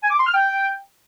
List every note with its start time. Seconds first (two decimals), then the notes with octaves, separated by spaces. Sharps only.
0.03 G#5
0.10 D6
0.18 C6
0.26 F6
0.34 G5